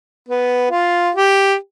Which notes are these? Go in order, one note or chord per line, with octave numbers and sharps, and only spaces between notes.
B3
F4
G4